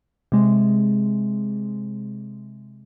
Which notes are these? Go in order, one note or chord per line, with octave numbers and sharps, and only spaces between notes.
C3 G#3